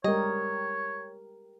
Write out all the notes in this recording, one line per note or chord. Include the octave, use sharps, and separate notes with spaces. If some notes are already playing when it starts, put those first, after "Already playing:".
G3 G#3 G4 A#4 C#5 D#5